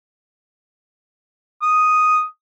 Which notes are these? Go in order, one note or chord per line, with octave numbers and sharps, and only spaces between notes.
D#6